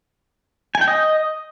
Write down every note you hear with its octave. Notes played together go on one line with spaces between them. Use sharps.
G#5
G5
D#5